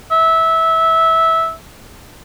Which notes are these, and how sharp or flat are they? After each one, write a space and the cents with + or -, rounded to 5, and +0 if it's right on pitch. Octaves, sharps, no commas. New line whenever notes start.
E5 -15